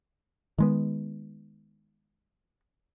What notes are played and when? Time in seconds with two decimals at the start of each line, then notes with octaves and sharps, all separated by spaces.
0.58 D#3 G#3 B3